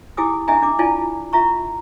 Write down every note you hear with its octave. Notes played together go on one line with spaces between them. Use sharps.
E4 G4 G#4 G#5 D6 D#6
D4 G#4 D#5 E5 G#5 A#5
D4 D6
E4 F4 D5 G#5 A5
F4 E5 A#5 C#6